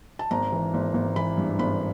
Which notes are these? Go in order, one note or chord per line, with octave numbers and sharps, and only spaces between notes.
A5
G#1 A#5
E3
G#1
G#1
E3 B5
G2
G#1 B5